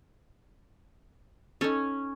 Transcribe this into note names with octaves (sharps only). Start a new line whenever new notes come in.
C#4 D#4 A4